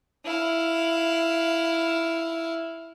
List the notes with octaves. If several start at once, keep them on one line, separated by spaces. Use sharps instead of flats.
E4 F5